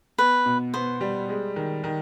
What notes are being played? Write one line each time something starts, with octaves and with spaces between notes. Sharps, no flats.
B3 B4
B2
B3 C5
G3
G#3
D#3
D#3